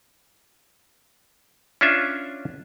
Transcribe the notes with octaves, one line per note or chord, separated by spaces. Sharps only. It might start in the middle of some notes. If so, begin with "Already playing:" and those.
C#4 D4 F4 E5